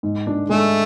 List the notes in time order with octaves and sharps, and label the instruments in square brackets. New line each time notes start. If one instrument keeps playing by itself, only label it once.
[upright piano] G#2
D4
[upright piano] G#3 [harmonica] A3